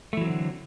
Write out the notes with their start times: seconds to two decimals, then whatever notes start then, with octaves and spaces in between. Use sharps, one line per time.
0.13 A3
0.17 E3
0.21 F#3
0.26 C4
0.30 D3